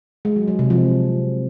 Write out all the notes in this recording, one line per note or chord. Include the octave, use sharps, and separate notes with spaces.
G#3
F#3
F#3
C3
F3